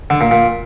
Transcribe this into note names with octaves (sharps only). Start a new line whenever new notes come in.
D3
A#2
A#2